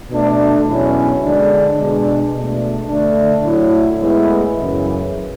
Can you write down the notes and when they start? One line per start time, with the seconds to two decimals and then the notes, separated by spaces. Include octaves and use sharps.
0.10 B2 A3 D4
0.67 E2 B2 F#3 C#4 E4
1.23 D3 G#3 D4
1.78 B2 G#3 D4
2.34 B2 A3 D4
2.89 D3 A3 D4
3.44 A2 F#3 A3 E4
4.00 A2 G#3 B3 E4
4.56 F#2 C#3 E3